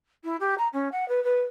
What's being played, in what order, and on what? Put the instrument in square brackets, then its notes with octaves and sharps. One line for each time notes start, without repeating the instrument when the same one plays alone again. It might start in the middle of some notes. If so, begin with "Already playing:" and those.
[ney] E4
G4
A#5
C#4
F#5
B4
B4